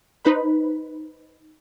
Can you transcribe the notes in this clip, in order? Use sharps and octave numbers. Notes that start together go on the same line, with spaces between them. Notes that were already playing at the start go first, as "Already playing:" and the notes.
D#4 B4 C5 B5